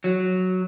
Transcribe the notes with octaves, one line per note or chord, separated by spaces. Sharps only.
F#3